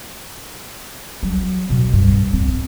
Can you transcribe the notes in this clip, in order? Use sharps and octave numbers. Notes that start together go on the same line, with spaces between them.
F#3
B2
G2
C4